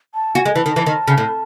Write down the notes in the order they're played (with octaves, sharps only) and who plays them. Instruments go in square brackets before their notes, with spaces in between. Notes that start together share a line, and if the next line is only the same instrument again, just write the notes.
[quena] A5
[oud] F#4 [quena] G#5
[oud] G#3
[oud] E3 [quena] A5
[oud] D#3
E3
D#3
C#3
A2